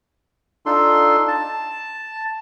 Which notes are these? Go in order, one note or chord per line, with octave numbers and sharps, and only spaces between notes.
D4 D#4 F4 A4 C6
A5